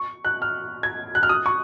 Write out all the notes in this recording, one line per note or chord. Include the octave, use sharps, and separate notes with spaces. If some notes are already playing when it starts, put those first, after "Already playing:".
Already playing: C#6
F#6
F6
G#6
F#6
F6
D#6
C#6